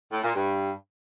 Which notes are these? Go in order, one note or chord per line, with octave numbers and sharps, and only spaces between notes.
A2
A#2
G2